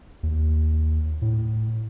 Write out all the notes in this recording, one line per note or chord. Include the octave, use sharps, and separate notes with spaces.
D#2
A2